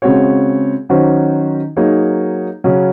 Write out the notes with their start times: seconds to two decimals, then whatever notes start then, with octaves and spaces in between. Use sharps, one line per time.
0.02 C#3 G#3 C4 F#4 C#5
0.89 D#3 F#3 C#4 F#4 C5
1.76 F#3 A#3 D#4 G#4 C#5
2.64 C#3 F#3 C#4